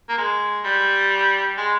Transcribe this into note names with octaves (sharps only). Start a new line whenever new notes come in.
A#3
G#3
G3
G#3